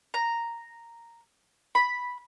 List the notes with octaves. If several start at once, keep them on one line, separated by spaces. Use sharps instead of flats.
A#5
B5